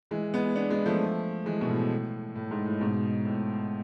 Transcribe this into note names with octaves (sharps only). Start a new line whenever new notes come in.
E3 G#3
G#3 B3
B3 D4
G#3 B3
F3 A3
E3 G#3
B2
A2
A2
G#2
A2
G#2 B2
A2